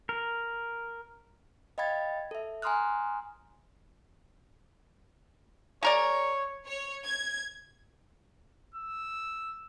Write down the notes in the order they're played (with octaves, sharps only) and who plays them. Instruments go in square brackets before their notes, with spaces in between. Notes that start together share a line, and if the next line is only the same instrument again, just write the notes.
[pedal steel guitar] A#4
[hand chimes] D#5 F5 G5 B5 G#6 A6
A4 E5
G#5 A#5 C6 D#6 F6 F#6
[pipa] G#3 A#4 D5 [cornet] C#5
[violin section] C#5
G#6
[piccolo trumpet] E6